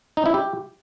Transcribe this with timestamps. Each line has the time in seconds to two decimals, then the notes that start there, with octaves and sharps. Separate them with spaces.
0.17 D#4
0.26 E4
0.34 G4